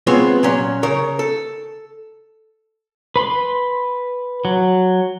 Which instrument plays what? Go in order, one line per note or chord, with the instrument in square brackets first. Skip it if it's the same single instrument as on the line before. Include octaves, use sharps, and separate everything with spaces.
[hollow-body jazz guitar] G#3 B3 C4 F4 C#5
A#2 F#3 C#4
C#3 A#4 C#5
A4
[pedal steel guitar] B4 B5 C6
F#3